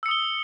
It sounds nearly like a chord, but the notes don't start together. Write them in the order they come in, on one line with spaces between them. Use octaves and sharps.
E6 C#7 D#6 G7